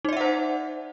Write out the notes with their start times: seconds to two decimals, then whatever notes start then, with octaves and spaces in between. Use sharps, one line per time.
0.05 D#4
0.09 D5
0.13 E5
0.17 F#5
0.21 C5